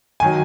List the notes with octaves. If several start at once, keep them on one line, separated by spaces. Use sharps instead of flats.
D#3 F#3 G#5